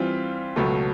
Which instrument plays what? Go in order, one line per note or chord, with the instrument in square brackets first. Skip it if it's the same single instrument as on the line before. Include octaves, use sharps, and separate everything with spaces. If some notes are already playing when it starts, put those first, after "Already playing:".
Already playing: [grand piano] E3 G3 C4 F4
C#2 B2 F#3 A3